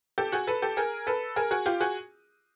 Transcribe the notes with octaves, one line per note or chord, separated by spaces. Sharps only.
G4 A4
F#4 G#4
A4 B4
G4 A4
G#4 A#4
A4 B4
G#4 A#4
F#4 G#4
F4 G4
F#4 G#4